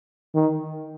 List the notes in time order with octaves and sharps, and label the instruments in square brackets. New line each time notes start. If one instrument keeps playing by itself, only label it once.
[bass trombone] D#3